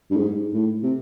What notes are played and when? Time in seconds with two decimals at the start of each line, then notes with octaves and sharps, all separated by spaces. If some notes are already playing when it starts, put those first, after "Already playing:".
0.11 G2
0.16 G#2
0.54 A2
0.83 C3